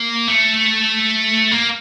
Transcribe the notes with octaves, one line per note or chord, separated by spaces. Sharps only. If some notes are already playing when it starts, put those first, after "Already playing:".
Already playing: A#3
A3
A#3